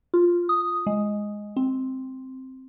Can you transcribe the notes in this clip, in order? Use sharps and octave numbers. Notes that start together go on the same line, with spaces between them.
F4
D#6
G#3
C4